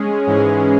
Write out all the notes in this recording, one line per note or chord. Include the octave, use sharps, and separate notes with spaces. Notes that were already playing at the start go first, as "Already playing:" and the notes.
Already playing: G#3 C#4 G#4
G#2 E3 G#3 C#4 G#4